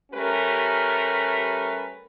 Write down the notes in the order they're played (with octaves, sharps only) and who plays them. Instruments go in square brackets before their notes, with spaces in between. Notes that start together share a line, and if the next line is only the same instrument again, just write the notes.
[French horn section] G3 A3 C#4 G4 A#4 B4